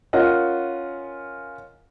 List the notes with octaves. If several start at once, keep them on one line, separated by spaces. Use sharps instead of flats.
C#4 F4 A#4 D#5 F#5